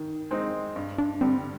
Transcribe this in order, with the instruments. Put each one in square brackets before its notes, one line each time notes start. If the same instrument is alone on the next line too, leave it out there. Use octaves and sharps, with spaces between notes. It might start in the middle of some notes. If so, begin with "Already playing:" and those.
Already playing: [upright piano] D#3
G#3 C4 D#4
G2
[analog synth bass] D4
[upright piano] D3 G3 [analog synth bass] C4